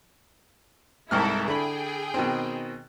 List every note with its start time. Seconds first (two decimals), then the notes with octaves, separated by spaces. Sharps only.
1.11 C2 G#2 E4 A4 A#4 F6
1.48 D3 G#4 G5 B5
2.14 B2 D#3 C4